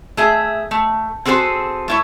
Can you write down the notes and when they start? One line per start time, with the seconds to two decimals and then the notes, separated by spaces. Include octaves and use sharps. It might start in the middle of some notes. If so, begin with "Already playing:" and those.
0.17 A3 G#4 E5
0.71 A3
1.25 C4 F#4 G#4 A4 C5
1.88 A3 E4 C#5